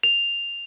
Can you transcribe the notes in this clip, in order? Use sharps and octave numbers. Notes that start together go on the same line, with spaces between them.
F7